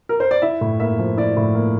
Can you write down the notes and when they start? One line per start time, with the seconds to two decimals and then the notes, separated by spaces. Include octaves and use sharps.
0.09 A#4
0.20 C5
0.31 D5
0.42 E4 E5
0.61 A2
0.80 A#3 E5
0.99 F3
1.17 E4 D5
1.37 A2
1.55 A#3